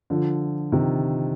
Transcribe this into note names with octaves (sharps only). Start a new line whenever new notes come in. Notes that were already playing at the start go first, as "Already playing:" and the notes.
D3 F3
C3 D#3